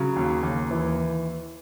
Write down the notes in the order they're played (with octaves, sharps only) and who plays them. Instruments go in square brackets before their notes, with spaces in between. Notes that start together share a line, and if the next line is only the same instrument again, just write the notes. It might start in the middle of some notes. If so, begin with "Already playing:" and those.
Already playing: [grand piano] C#3 F#3
D#2
D#2
E3